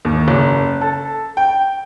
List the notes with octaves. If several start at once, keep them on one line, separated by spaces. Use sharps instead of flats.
D#2
F#1
A4
G5